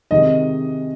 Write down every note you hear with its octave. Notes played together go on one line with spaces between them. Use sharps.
C3 D#3 G#3 D#5